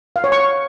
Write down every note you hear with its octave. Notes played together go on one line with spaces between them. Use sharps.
F5
C#5
C#6